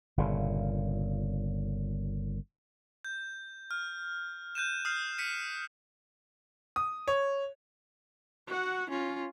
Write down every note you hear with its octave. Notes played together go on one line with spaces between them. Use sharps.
G1 A#2 C#3
G6
F6
F#6 G6 D#7 E7
D#6 F6 G6 C7
B6 C#7 D#7
D#6
C#5
F#4 F#5
C#4 F4